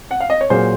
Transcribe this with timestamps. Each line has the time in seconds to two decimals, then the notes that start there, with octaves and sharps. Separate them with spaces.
0.11 F#5
0.20 F5
0.30 D#5
0.41 C#5
0.50 A#2 F#3 A#3 G#4 C5